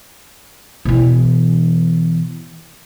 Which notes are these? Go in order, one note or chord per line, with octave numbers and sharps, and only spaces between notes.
B2 E3